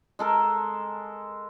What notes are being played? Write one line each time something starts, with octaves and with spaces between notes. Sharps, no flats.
G#3 A4 A#4